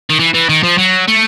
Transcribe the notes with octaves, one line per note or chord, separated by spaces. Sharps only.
D#3
E3
E3
D#3
F3
F#3
A3